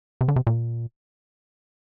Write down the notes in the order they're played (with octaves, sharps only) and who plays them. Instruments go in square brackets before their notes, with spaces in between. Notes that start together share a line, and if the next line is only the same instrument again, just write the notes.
[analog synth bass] C3
D3
C3
A#2